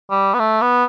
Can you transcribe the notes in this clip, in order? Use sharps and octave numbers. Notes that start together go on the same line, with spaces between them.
G3
B3
A3
B3